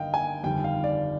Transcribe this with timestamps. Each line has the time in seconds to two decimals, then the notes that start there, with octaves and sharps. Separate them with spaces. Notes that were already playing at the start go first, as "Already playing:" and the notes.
Already playing: G1 G2 D#3 A#3 D#5 F5 G5
0.14 G#5
0.43 G1 F2 D#3 G3 G5
0.64 F5
0.84 D5